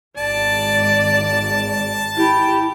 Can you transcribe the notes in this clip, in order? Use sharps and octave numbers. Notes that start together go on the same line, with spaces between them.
G#1 D5 A5
E4 G4